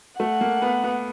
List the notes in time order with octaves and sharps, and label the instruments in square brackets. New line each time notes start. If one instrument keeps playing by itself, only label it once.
[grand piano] A3 [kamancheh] F#5
[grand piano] A#3
B3
B3